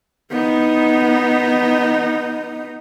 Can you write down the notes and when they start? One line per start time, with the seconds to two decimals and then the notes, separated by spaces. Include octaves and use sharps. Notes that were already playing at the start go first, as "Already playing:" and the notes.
0.31 B3 D#4